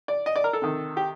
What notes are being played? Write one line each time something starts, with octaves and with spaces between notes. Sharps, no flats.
D5
D#5
D5
A#4
A4
C3 D#3
G4